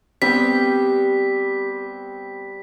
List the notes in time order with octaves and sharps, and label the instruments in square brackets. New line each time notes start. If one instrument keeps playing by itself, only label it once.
[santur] G3 [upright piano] B3 C4 [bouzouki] G4 [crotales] B6